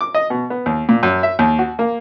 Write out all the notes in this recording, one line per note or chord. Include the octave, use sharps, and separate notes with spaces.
D6
D#5
B2
B3
D#2
A#2
F#2
E5
D#2
F#4
A#3